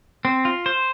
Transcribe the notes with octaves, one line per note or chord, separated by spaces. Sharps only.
C4
F4
C5